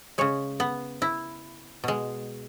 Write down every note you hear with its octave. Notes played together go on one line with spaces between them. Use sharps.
C#3 G#3 C#5
B3
E4
B2 G#3